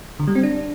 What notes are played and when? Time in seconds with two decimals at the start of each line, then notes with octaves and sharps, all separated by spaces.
0.20 D3
0.27 G3
0.35 C4
0.43 D4